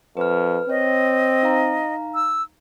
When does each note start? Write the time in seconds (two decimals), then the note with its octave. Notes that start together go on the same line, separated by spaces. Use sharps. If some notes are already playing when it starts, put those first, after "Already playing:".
0.17 F2 B4 F6
0.69 C4 C#5 D#5
1.43 D#4 F5 A#5
2.15 E6